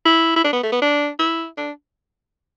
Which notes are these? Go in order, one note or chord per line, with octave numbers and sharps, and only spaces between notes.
E4
E4
D4
B3
A3
B3
D4
E4
D4